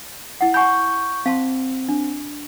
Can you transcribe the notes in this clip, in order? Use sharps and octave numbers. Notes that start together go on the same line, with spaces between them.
E4 F#5
F#5 G#5 B5 C#6 G6
C4 F5 A5 C6
D4